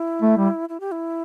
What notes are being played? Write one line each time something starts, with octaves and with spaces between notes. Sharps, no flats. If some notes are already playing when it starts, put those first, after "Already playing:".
Already playing: E4
A3
G3
E4
G4
E4